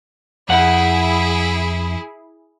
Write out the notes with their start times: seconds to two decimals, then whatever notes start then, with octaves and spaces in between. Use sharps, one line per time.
0.49 F2 E4 G#4 F#5